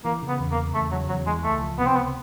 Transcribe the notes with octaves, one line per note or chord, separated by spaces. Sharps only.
E3 A#3
C#3
B3
E2
A#3
C#3
E2 A3
C#3 F#3
E2 F#3
E3 G#3
C#2 A3
F3
C3 B3
C4
C#2 B3